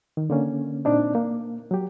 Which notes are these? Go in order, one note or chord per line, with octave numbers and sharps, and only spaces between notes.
D#3
D3 A#3 C#4
A#2 C4 D4 D#4
A#3
F#3 G4